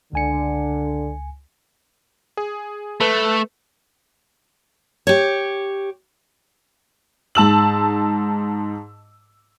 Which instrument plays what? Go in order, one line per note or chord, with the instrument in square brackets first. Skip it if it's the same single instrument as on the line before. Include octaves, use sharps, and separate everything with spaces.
[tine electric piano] C#2 G#5 C#7 [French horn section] D3
[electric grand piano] G#4
[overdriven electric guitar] A3 [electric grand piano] A4 B4
[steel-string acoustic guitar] G4 C#5
[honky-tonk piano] G#2 A5 E6 F#7